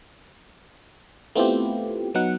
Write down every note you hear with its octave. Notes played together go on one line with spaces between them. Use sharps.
A3 B3 C4 E4 F4 G4
F#3 B3 D#4 F#5